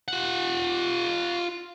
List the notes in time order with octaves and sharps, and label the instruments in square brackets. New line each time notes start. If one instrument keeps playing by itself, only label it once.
[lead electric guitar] F4 F#5